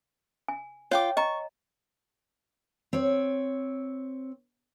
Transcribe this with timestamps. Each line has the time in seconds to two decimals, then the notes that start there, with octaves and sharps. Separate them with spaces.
0.48 G#5
0.91 F4 C#5 G5 D6
1.17 D#5 A#5 C#6
2.93 C4 C#5